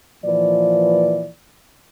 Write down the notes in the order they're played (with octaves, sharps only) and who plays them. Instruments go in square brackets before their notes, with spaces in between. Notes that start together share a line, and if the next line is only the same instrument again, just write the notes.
[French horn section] A#2 E3 F3 B4 D5